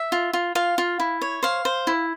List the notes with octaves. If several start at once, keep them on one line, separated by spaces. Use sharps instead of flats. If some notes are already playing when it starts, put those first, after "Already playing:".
Already playing: E5
F4
F4
F4 F5
F4
E4
C#5
C5 F5
C5
E4